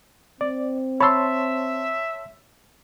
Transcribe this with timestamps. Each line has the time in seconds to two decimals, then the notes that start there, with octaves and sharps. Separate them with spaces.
0.41 C4 D5
1.01 C#5 E5 A5 B5 C6 E6